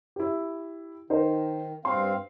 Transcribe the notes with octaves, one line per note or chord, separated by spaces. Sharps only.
E4 G4
D#3 D#4 A#4 C5
G2 C4 F5 C6